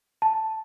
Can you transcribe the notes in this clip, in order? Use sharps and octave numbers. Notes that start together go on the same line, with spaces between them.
A5